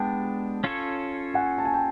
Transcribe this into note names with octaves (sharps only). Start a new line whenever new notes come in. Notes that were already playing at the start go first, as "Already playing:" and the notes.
Already playing: G#3 B3 D4 G5 A5
C#4 F4 A4 C#5
F#5 G#5
A5
G#5
G5 A5